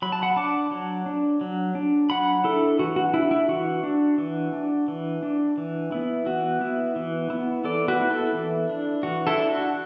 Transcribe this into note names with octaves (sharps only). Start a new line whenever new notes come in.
F#3 B5
A5
F#5 B5
D4 A5 D6
F#3
D4
F#3
D4
F#3 F#5 B5
D4 E4 A4
E3 F#4
F#4
D4 E4
E4
E3 F#4
D4
E3
D4
E3
D4
E3
B3 E4
E3 F#4
B3 E4
E3
B3 E4
E3 A4 D5
F#4 B4
B3 E4
E4 A4
E3
D4
E3 F#4
E4 A4
D4
F#4